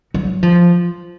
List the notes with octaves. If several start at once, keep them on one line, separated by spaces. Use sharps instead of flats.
F#3
F3